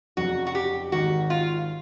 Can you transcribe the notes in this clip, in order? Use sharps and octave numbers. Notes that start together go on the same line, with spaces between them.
F1 F2 C#3 F#3 F#4
F#4
G4
G#1 G#2 D#3 F#4
F4